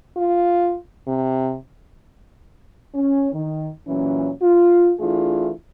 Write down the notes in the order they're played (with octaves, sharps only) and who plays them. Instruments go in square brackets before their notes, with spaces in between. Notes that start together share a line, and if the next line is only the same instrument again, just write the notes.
[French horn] F4
C3
[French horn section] C#4
D#3
A#2 E3 F#3 C#4
F4
E3 A3 D4 E4 F4 G#4